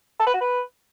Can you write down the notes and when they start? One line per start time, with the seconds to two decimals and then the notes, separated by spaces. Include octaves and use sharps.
0.19 A4
0.27 B4
0.34 F#4
0.41 B4